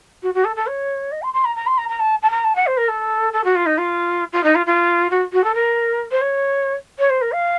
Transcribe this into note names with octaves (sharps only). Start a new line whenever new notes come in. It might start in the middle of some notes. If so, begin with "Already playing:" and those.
F#4
F#4
A4
A4
C#5
D#5
C6
C6
A#5
A#5
C6
A#5
A#5
A5
A5
A#5
A5
F#5
C5
A#4
A4
A4
F#4
F4
D#4
F4
F4
D#4
F4
F4
F#4
F#4
A4
A#4
C5
C#5
C#5
C5
A#4
F5